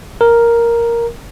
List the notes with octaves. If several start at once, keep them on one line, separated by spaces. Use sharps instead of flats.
A#4